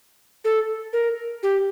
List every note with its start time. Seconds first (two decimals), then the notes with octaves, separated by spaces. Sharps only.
0.45 A4
0.93 A#4
1.43 G4